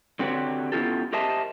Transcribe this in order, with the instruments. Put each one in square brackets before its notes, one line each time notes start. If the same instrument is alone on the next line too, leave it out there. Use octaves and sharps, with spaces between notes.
[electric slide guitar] D3 C4 F#4 G4 B4 C#5
B3 C#4 E4 F4 G4 A4
G4 A#4 C5 D#5 E5 A5